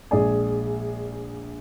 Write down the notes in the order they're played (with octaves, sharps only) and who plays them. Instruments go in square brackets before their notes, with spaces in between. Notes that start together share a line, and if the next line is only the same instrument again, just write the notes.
[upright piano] A#1 G#3 G#4 D5 G#5